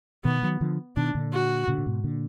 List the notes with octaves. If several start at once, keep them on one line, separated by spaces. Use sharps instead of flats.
B2 D#3 B3
D#3 F#3
D3 F3
B2 D#3 D4
A#2 D3
F#4
A#2 D3
A#2
G#2 B2
A#2 D3